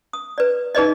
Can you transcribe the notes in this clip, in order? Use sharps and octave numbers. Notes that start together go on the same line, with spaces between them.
D#6
B4 D5
D#4 G#4 B4 D5 D#5